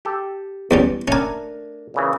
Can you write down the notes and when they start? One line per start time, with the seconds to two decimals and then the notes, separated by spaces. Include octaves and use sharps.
0.05 G4 A4
0.71 E2 G3 C#4
1.08 A3 C#4 D4 A#4 G#5
1.94 A#2 C#3 E3